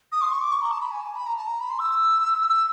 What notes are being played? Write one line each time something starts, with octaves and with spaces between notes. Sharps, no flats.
D#6
C6
C#6
D6
C#6
A#5
A5
B5
G#5
A5
B5
A#5
A5
A#5
B5
C6
E6
E6